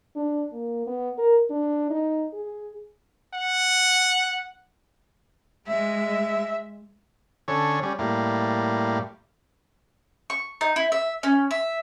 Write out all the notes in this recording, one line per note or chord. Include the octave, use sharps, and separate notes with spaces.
D4
A#3
B3
A#4
D4
D#4
G#4
F#5
G#3 E5
D3 C#4 A4 C#5
G3 C#4
A2 G3 A#3
C#6
D#4
E4
E5
C#4
E5